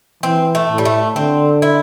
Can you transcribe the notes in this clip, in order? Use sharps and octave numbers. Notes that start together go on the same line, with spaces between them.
E3 C4
A3
A2
G3
A3
D3 C4
E4